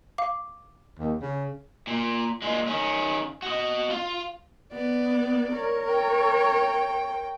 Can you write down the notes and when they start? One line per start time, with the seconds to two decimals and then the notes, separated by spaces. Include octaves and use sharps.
0.18 F5 D6
0.99 D#2
1.21 C#3
1.87 A#2
2.42 A#2 G#3
2.68 D#3 C#4
3.42 F#4 D#5
3.90 F4
4.73 B3 D5
5.53 A#4 C#5
5.88 G5